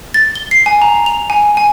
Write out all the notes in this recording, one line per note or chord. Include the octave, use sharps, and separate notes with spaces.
A6
G7
C7
G#5
A#5
F7
G#5
G#5